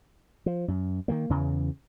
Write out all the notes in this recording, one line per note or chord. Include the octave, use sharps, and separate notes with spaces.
F3
F#2
D#3 F3 A#3
E2 C#3 E3